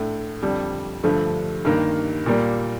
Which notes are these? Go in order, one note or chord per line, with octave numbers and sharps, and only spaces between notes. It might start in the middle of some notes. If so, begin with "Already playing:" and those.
Already playing: A2 A3 D4
F2 D3 G3
G2 D3 F3 A3
G2 D#3 A#3
A#2 G3 A#3